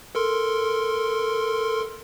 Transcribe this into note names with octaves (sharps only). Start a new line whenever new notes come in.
A4 A#4 C6